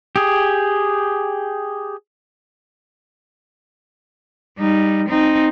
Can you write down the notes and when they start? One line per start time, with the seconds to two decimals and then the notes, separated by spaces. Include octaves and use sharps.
0.16 G4 G#4
4.59 G3 D#4
5.09 C4 D#4